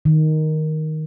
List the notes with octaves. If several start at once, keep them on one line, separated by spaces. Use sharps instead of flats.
D#3